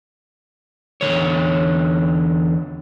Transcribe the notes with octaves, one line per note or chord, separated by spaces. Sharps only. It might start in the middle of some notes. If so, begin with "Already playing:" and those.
E2 D3 D#3 C#5